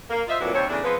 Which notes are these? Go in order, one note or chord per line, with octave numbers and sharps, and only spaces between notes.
A#3
F4 C5 D#5 E5
F2 A#2 F#3 D4 E4 B4
D#2 G3 C4 C#5
E2 C#3 A3 D4
F3 G#3 B3 C4 B4